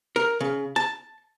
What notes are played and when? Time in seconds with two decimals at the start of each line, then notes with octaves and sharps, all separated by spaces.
0.16 A#4
0.40 C#3
0.76 A5